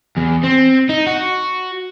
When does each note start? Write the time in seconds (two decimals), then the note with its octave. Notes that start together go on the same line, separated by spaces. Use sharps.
0.17 E2
0.44 C4
0.89 D#4
1.07 F#4